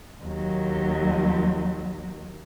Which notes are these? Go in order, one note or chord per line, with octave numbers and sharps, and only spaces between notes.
D#2 F#3